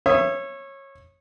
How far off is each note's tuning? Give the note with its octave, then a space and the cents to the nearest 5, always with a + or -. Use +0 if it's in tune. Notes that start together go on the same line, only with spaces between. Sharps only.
C#5 -20 E5 +25 D#6 +0